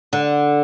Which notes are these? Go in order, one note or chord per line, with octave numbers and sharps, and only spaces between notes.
D3